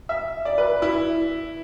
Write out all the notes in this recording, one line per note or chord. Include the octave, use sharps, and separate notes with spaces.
E5
D5
B4
E4